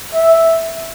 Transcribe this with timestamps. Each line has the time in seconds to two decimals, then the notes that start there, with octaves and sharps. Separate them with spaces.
0.14 E5